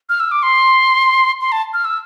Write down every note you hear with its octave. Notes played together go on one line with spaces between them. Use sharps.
F6
E6
D6
C6
C6
A5
F6
E6